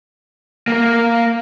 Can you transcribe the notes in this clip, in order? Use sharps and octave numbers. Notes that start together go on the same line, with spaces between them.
A#3 A#4